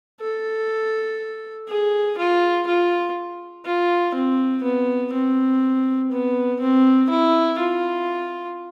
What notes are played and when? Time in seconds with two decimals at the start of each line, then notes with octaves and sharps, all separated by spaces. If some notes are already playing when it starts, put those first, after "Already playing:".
0.21 A4
1.69 G#4
2.18 F4
2.67 F4
3.65 F4
4.15 C4
4.63 B3
5.13 C4
6.12 B3
6.61 C4
7.10 E4
7.59 F4